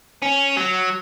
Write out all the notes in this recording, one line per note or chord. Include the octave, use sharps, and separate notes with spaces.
C#4
F#3